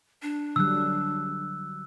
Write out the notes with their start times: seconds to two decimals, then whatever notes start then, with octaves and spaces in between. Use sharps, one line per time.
0.22 D4
0.56 D3 F#3 G3 E6 F#6